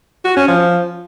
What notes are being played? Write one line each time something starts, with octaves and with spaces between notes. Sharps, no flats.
F#4
C#4
F3